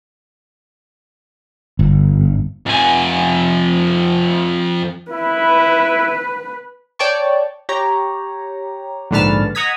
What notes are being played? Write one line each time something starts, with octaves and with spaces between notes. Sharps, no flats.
G1
F2 G#5
E4 B4
C#5 D5 G5 A5 C#6
G4 C#5 A#5
A#1 G#2 D3 B4 A5 F6
D#5 F#5 A#5 D#6 G#6 B6